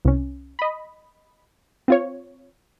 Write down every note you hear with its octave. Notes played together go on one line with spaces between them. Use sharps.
C2 C#4
D#5 B5
C4 F4 C#5